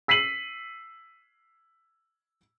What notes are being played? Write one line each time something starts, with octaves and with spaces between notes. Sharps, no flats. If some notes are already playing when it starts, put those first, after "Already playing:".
E6 B6 C7 D#7 F#7